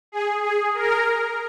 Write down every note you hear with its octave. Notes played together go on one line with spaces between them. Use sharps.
G#4
G#4
A#4